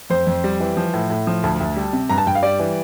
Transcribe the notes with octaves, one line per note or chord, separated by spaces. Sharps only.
F2 C5
F2
G3
E3
F3
A2
A2
F3
D2 A5
D2
G3
C3
G2 A#5
A5
G2 G5
F5
G3 D5
E3